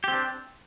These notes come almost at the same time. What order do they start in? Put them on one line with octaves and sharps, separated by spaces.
G4 C4 D4